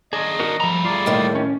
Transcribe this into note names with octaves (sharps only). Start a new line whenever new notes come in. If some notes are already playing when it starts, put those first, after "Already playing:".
D#3 D4 G#4 D#5
D#4 F#4 A#4
F3 G3 A3 A#5
F4 G#4 D5
D#2 A2 D#3
C#4